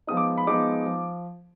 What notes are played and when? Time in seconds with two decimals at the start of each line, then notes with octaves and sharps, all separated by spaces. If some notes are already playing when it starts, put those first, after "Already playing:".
0.07 F3 G#3 B3 D#4 D#6
0.17 D6
0.38 B5
0.47 F3 G#3 B3 D#4 D6
0.85 F3